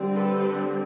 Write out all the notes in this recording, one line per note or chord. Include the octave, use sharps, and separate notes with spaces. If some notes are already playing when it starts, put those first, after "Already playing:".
Already playing: D3 G3 C4
A4 B4